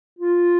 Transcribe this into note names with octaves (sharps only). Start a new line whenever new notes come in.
F4